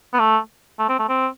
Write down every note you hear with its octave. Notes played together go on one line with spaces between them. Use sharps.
B3
A3
A3
C4
A3
C4